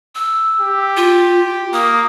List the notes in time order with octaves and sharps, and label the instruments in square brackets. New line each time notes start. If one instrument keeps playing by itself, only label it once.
[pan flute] E6
[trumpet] G4
[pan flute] F4
[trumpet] A#3 [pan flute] D#6